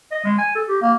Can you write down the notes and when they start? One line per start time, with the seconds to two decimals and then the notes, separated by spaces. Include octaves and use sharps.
0.12 D#5
0.24 G#3
0.38 G#5
0.55 A4
0.68 G4
0.81 A#3